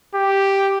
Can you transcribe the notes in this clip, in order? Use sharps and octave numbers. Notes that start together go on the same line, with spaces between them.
G4